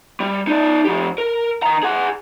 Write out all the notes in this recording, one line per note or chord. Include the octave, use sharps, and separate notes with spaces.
G3
D#4 D5
F3 G4
A#4
D#3 A#5
G#4 F#5